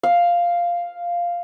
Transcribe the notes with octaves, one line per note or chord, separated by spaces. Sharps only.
F5